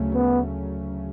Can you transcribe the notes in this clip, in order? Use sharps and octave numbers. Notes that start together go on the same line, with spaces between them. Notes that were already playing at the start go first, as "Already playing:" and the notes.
Already playing: D2 C#3 F#3 A3 C#4
B3